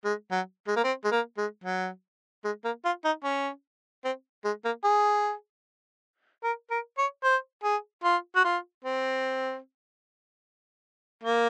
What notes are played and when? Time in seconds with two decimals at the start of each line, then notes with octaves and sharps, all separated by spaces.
0.04 G#3
0.31 F#3
0.67 G#3
0.76 A#3
0.84 C4
1.04 G#3
1.11 A#3
1.37 G#3
1.64 F#3
2.44 G#3
2.64 A#3
2.85 F4
3.04 D#4
3.24 C#4
4.04 C4
4.44 G#3
4.64 A#3
4.84 G#4
6.43 A#4
6.70 A#4
6.98 C#5
7.23 C5
7.63 G#4
8.04 F4
8.36 F#4
8.44 F4
8.84 C4
11.23 A#3